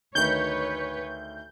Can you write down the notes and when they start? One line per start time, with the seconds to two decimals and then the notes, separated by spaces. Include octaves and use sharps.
0.15 D2 D#3 B4 C#5 G6